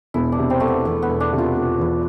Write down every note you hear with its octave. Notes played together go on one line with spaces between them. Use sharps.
E1 E4
D4
C3
C4
E1 A3
B3
E2 A3
B3
E1
D4
C3
F4
E1
E2